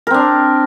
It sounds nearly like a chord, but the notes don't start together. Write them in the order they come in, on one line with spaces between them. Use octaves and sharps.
A#4 C4 D4